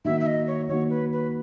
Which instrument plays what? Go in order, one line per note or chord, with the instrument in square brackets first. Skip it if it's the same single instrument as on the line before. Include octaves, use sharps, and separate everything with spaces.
[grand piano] D#3 A#3 D#4 F#4 [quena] E5
[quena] E5
D#5
C#5
[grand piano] D#3 A#3 D#4 F#4 [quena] C#5
[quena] B4
B4